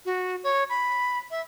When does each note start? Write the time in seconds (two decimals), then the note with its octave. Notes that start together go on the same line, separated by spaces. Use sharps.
0.05 F#4
0.44 C#5
0.69 B5
1.31 E5